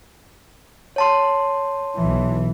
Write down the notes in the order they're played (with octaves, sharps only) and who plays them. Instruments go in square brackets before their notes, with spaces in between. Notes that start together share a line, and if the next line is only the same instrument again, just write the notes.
[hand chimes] C#5 A5 C6
[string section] B1 E3